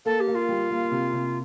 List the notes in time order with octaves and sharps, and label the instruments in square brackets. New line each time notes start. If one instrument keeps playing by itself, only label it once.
[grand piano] A#3 [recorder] A4
[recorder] G4
[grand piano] A#3
[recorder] F4
[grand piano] G3
A#3
C3
C3